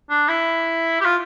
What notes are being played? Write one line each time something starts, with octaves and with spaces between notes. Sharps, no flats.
D4
E4
G4
F4